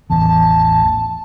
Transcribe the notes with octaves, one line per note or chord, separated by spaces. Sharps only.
A1 E2 A5